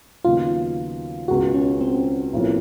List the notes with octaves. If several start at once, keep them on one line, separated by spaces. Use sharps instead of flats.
D#2 C#3 F#3 B3 D#4 F4
C#2 B2 G#3 F#4
C#4
C4
B1 A2 F3 A#3 C#4